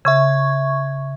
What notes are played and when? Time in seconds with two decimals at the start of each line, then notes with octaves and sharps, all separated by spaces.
0.05 C#3 E5 C#6 G#6